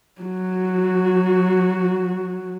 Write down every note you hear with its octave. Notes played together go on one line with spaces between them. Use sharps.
F#3 F#4